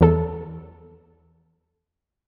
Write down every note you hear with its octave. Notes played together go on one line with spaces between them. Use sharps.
E2 A4